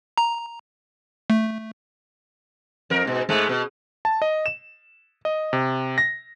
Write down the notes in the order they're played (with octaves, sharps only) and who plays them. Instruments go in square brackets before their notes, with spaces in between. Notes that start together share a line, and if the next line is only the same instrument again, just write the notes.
[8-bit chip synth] A#5
A3
[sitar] F2 A#4
G#2 B2
G#2 G#3 A3
B2
[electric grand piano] A5
D#5
E7
D#5
C3
A#6